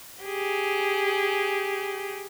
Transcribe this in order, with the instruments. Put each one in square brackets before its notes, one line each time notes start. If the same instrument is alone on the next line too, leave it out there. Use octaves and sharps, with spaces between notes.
[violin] G4 G#4